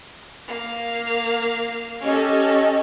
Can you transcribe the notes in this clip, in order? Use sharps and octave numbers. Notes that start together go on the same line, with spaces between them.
A#3 F5
C#4 G4 A4 D#5